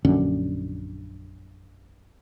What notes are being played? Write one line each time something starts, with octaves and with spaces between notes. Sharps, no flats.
A#1 F#2 D3 C#4